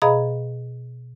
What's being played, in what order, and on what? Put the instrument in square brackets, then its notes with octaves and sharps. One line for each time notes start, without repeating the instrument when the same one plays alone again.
[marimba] B2 G#4 D#5 F5 A#5 B5